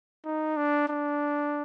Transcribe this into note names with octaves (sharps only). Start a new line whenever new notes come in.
D#4
D4
D4